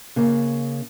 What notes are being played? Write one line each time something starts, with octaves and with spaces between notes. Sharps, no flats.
C#3 A#3